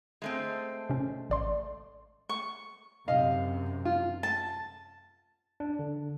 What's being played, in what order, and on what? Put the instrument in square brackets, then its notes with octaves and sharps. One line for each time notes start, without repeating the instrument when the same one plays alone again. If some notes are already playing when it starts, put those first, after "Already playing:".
[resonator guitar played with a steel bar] G#3 A3 C4
[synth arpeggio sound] C3 C#4
A1 D5 C6
[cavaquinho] C#6
[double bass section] F#2 C3 [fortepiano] D#5 F5
[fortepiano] F4
[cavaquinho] A5
[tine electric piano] D4
D3